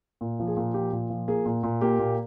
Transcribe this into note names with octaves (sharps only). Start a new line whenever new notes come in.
A#2
F3
G#4
A#2
F3 G4
A#2
F3
A#3 G#4
A#2
A#2
A#3 G4
A#2